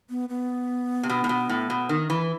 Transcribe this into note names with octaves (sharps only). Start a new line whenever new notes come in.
B3
B3
C3
B2
A2
B2
A2
B2
D#3
E3